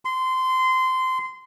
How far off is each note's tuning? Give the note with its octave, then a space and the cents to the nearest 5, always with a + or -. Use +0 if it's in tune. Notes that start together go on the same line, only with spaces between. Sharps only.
C6 -20